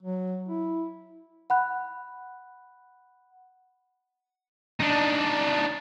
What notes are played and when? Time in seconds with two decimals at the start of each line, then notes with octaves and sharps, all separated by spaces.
0.02 F#3
0.48 E4
1.50 F#5 B5 F#6
4.80 D4 D#4